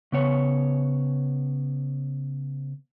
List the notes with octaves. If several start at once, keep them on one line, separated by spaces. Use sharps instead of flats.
C#3 B3 C#5